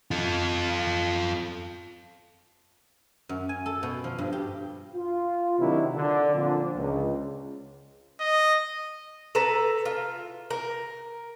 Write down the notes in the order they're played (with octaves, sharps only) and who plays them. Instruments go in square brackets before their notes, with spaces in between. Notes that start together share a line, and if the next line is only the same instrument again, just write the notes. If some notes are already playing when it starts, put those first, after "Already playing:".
[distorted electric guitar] F4 A4
[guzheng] F#2
G#5
A4
B2
F3
G2
G4
[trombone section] F4
C3 D#3 F#3 C4 D4 E4
D3 D4
A#2 F3 C4 D4
C#2
[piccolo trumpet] D#5
[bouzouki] A4 B4 A#5
F4
A#4